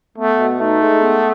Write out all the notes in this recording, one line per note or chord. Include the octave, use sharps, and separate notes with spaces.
A3 B3
B2
A3 D#4
G#3
B3